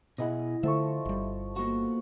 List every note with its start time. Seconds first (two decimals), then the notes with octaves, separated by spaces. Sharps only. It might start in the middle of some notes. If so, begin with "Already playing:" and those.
0.18 B2 E4 G#4 D#5 F#5
0.63 D3 F3 A3 A4 E5 C#6
1.05 G1 G3
1.56 A#3 B3 F#4 C#6